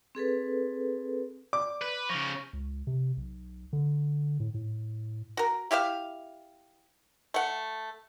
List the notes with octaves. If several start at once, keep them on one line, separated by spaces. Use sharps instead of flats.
C4 G#4 A4 B4
D5 D6
B4
C#3 F3 C#6 A#6
C#2
C3
B1
D3
A2
A2
F#4 A#4
E4 G4 E5 F5
A3 F#5